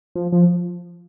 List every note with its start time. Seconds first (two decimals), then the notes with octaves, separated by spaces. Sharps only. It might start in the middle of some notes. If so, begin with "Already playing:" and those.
0.15 F3
0.32 F3